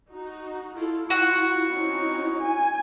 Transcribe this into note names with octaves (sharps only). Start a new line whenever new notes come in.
D#4 F#4
E4 F4 A4
F4 F#4 F#5 C#6
C4 C#4 D#4
G#5